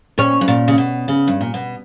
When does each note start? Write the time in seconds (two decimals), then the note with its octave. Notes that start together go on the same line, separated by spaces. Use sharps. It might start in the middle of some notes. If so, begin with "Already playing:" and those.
0.18 A#2 C#4
0.41 G2
0.48 A#2
0.68 C#3
0.78 B2
1.08 C#3
1.27 G2
1.41 A#2
1.54 B2